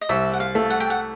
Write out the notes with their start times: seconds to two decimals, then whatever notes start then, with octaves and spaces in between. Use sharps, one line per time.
0.01 D#5
0.09 C2 E5
0.33 F#5
0.40 F5
0.55 A3
0.70 F#5
0.80 G5
0.90 F#5